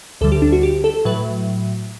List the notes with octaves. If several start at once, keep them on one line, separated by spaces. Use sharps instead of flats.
D2 D3 G3 A4
G4
D4
F#4
G4
A4
A2 F#3 B4